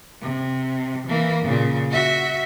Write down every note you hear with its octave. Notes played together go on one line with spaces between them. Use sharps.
C3
E3 A#3
A#2 C#3
F#4 E5